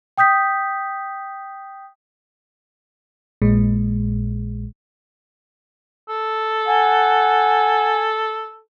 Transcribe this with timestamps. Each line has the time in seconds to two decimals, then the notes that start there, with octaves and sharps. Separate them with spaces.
0.18 G5 D#6 G6 B6
3.42 A#1 A#2 G#3
6.09 A4
6.68 F#5 G#5